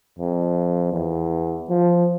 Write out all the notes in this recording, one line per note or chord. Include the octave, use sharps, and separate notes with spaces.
F2
E2
F3